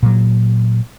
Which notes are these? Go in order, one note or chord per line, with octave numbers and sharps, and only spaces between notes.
A#2 F#3